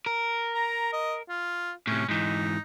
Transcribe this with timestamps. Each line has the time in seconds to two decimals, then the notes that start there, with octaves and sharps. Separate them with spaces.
0.06 A#4
0.54 A#5
0.93 D#5
1.29 F4
1.87 A2 C3 C#4
2.08 G#2 E3 D#4